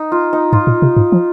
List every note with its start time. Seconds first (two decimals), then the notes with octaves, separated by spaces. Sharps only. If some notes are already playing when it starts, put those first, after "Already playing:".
Already playing: D#4
0.12 F4
0.33 D#4
0.53 G#2 F4
0.67 A#2
0.82 C3
0.97 G#2
1.12 F3